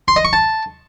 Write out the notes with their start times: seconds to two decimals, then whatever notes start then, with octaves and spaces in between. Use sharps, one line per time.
0.08 C6
0.16 D#5
0.25 C#6
0.33 A5